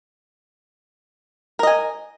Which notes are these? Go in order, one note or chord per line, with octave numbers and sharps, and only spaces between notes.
A#4 D#5 G#5